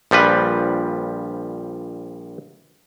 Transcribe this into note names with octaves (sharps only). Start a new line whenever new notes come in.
A#1 F3 G3 B4